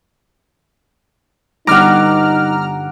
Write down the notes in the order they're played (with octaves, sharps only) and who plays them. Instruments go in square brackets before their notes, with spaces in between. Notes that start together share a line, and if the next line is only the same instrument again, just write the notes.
[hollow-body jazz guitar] G2 D3 G3 [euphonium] D#4 [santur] F#5 D6 [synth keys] A#5 F6